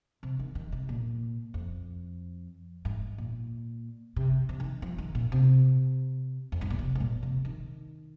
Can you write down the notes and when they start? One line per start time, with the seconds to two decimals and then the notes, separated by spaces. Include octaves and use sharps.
0.23 C3
0.39 D#3
0.55 D#3
0.72 C3
0.89 A#2
1.54 F2
2.85 G#2
3.18 A#2
4.16 C3
4.49 C3
4.60 D#3
4.82 F3
4.98 D#3
5.15 A#2
5.32 C3
6.52 F2
6.61 G#2
6.70 A#2
6.79 C3
6.95 G#2
7.00 A#2
7.23 C3
7.45 D#3